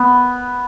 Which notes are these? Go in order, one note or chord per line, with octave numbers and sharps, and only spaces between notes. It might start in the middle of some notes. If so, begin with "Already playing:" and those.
Already playing: B3